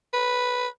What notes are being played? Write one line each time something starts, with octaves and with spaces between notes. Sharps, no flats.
B4